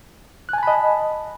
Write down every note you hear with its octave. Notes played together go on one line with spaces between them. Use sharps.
D#5 G#5 A5 B5 F#6